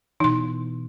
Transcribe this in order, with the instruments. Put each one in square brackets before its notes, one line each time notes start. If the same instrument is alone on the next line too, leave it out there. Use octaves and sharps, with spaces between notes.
[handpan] B2 E3 [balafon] D#4 C6